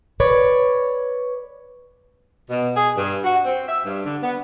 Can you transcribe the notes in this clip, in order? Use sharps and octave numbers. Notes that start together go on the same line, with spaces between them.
B4 C#5 D5
B2
G#4
G2
F#4
C4
E5
G2
D3
B3